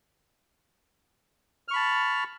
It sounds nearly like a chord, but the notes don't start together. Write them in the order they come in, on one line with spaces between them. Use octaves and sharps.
F6 C#6 B5 A5